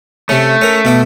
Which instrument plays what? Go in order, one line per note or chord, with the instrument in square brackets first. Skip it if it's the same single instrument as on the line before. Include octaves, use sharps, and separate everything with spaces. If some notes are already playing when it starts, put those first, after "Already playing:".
[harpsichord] C3 C#4 [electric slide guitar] A3
[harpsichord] C#4 A#4
B2 E5 D6